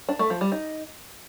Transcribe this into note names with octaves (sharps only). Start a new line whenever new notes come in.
D4
A3
F3
G3
D#4